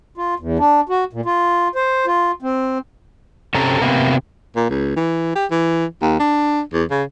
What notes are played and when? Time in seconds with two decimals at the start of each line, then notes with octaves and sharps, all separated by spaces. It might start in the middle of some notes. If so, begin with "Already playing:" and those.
0.17 F4
0.39 E2
0.59 D4
0.89 F#4
1.13 A#2
1.26 F4
1.75 C5
2.06 F4
2.42 C4
3.54 C3 C#4 A4 A#5
3.81 C3 A#3 B3
4.56 A#2
4.70 C#2
4.96 E3
5.35 G4
5.51 E3
6.02 D#2
6.19 D4
6.73 E2
6.91 C#3